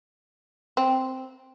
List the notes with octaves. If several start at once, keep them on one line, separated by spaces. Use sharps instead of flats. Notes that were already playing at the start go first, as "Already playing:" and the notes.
C4